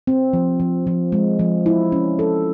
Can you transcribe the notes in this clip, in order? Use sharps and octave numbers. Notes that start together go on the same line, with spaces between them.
C4
F3
F3
F3
G#3
F3
E4
C#4
A4